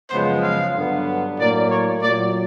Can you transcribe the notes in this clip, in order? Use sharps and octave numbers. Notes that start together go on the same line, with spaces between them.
F#2 C#3 F3 G#3 B3 C5
F5
G2 D3 F#3 B3
A2 F#3 A#3 D5
C#5
A#2 F#3 A3 D5